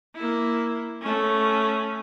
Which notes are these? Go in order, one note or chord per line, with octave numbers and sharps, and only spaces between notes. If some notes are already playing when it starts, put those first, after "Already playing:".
A#3 E4
A3 C#4